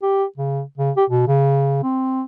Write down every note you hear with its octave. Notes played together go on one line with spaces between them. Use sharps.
G4
C#3
C#3
G4
B2
C#3
C4